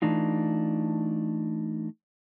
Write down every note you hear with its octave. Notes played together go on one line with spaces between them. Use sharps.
E3 A3 D4 D#4 F4